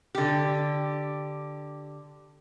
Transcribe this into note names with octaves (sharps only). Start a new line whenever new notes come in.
D3 G4